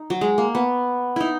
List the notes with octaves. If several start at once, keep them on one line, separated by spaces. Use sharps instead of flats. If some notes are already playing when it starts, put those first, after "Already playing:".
Already playing: D#4
F#3
G#3
A#3
B3
D#4 E4